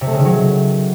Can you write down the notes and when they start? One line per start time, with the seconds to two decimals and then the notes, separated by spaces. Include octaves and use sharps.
0.01 C3
0.07 A3
0.13 C#3
0.19 D#3
0.25 F#3